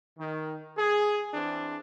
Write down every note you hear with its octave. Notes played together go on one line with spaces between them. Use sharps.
D#3
G#4
E3 C4 D4